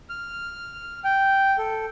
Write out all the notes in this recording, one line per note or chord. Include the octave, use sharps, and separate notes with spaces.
F6
G5
A4